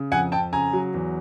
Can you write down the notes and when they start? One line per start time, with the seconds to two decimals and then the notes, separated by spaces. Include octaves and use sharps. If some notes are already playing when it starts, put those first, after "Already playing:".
Already playing: C#3
0.12 F2 F#5 G#5
0.32 F2 G5 A5
0.53 C#3 G#5 A#5
0.73 F#3
0.94 E2